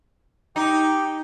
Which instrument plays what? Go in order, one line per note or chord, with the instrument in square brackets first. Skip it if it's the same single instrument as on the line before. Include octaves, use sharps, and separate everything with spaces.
[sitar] D#4 [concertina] G4 G5